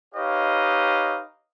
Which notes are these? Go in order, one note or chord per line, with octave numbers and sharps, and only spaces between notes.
D#4 G4 B4 C#5 D#5 F5